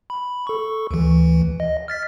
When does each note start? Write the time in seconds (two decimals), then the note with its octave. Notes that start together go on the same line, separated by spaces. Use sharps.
0.10 B5
0.47 A4 C#6
0.91 D2 E3
1.60 D#5
1.88 F6 A6 B6